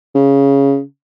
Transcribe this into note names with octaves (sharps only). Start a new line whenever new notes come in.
C#3